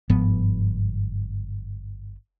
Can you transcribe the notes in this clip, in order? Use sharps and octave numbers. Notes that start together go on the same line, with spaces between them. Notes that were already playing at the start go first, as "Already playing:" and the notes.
G1 G#2 F3 B3